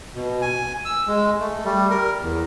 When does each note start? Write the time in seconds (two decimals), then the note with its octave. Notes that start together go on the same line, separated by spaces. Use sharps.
0.15 B2
0.42 G#5
0.85 E6
1.07 G#3
1.40 A3
1.65 G3
1.90 A#4
2.20 E2